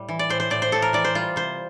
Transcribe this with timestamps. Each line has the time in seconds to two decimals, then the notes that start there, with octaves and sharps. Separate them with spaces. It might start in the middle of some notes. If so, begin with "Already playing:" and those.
Already playing: A2 G3
0.09 E3
0.19 D5
0.30 A2 C5
0.40 C5
0.50 A2 D5
0.62 C5
0.72 A2 A4
0.82 A#4
0.93 E3 D5
1.04 C5
1.15 G3 F4
1.36 C3 C5